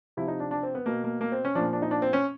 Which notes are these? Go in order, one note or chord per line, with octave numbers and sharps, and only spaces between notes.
C3 F3 E4
D#4
D4
D4
C4
B3
B2 A#3
A#3
A#3
C4
C#4
A#2 F3 D4
D4
D#4
D4
C4
C#4